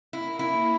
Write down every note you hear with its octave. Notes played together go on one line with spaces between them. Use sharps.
A#3 E4
E4